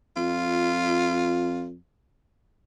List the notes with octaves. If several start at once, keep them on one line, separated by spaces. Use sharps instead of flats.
F2 F4